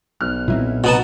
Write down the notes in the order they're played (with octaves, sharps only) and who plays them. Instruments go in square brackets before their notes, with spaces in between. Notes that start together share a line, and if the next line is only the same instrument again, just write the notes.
[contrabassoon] B1 [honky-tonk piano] F6 F#6
[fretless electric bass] A#2 F#3 C4 [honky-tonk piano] E4
[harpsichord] B2 B3 A5 [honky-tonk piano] F#5 A#5